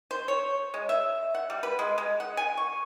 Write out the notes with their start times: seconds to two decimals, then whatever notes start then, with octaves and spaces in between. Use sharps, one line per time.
0.11 C5
0.28 C#5
0.74 G#3
0.89 E5
1.35 F#5
1.50 G3
1.63 B4
1.79 G#3
1.98 G#3
2.20 F#5
2.37 G#5
2.57 C#6